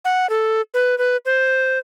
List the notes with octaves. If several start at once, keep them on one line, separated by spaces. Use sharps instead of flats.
F#5
A4
B4
B4
C5